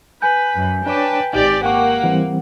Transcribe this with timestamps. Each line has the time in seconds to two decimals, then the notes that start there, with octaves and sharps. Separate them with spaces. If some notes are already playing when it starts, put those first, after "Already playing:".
0.22 B4 G#5 G6
0.55 F#2
0.86 D4 B4 C#5 G5 A5 D6
1.33 G#1 D#4 G4 D5
1.64 A#3 F#5 G5 C#6 D6
2.04 E3 G3 C4